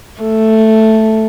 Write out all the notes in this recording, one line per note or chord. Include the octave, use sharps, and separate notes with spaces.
A3